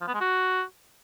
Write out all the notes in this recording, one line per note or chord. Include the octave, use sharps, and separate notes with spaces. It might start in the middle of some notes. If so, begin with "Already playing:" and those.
F3
B3
G#3
F#4